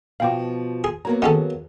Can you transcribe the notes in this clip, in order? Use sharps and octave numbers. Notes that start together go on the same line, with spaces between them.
B2 F3 F5 G5 D6
G#4
F#3 A#3 B3 A#5
D#3 C#4 G#4 A4 F#5